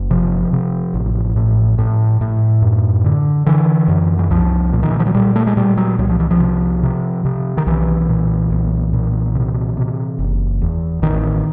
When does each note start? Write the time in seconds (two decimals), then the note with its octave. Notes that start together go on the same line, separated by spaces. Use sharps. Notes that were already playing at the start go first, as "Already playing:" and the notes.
Already playing: F#1
0.10 C3 F3
0.53 C3
0.94 A1
1.36 A2
1.78 A2
2.21 A2
2.62 F#2
3.04 D3
3.46 D3 E3
3.88 F#2
4.19 E3
4.30 C2 F3
4.73 A#2
4.83 D#3
4.91 E3
4.99 F3
5.07 F#3
5.15 A#2 G3
5.36 A3
5.47 G#3
5.57 A#2 G3
5.77 F#3
5.99 C2 F#3
6.09 F3
6.20 E3
6.31 F3
6.40 C3
6.83 C3
7.25 C3
7.57 D#3
7.66 B1 E3
8.09 A#2
8.51 B1
8.93 A#2
9.35 C3
9.77 C3
10.19 F#1
10.61 E2
11.02 A1 D#3